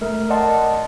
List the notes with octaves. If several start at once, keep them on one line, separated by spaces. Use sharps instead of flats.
A3 A#4
D5 D#5 F#5 A5 C6